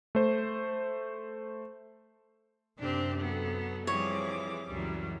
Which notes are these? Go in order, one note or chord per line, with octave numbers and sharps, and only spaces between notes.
A3 C5
F#2 C3 C4 D4 G4
F#3 B3 A4
E3 F3 G3 C4 G#4 C#5 D6
C#2 F#2 E3 F#3 G3